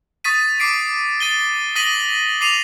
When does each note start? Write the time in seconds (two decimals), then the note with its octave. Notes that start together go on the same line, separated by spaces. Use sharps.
0.24 C#6 D#6 A6 B6 D#7
0.60 D6 C7 D7
1.20 A6 D#7 G7
1.76 D#6 A#6 B6 D#7 F#7 G7
2.41 D6 C7 D#7 F7